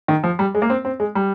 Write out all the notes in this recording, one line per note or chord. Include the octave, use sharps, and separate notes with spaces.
D#3
F3
G3
G#3
A#3
C4
C4
G#3
G3